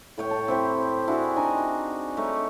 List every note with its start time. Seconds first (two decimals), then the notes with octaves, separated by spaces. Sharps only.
0.18 A2 C#5 G5
0.31 A5
0.48 C4 E4 G4
1.07 D4 E4 F#4 G#4
1.36 D4 D#4 G#5
2.17 A3 D#4 G4 C#5